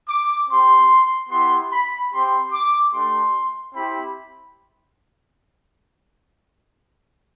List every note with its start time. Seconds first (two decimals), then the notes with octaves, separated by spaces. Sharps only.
0.08 D6
0.49 C4 G4 C6
1.30 B3 E4 G4 C6
1.72 B5
2.12 C4 G4 C6
2.52 D6
2.92 A3 D4 G4 C6
3.74 C4 E4 G4 B5